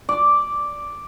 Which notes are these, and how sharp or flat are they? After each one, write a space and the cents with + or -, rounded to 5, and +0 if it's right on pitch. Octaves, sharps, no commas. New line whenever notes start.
D5 -5